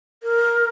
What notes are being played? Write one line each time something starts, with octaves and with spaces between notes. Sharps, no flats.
A#4